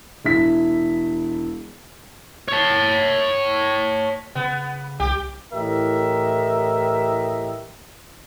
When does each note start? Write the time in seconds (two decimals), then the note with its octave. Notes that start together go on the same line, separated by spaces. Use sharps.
0.25 E1 E4 B6
2.48 C#5 A5
4.35 C#3 B3
5.00 C2 G4
5.53 A2 E3 G4 A#4 D#5 E5